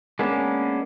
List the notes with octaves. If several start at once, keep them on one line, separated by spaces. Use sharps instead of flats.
G#3 A#3 B3 C#4 D4